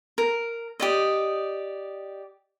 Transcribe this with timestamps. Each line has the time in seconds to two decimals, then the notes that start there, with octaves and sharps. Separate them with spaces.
0.18 A#4
0.80 G4 D5 D#5